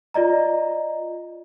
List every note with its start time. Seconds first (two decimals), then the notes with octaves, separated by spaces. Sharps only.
0.14 F4 D5 D#5 A#5